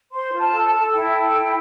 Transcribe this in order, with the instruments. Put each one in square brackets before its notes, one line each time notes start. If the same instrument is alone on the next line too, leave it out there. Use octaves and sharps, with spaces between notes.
[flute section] C5 C6
F4
A5
A4
A5
A4
E4 G5
A4
E4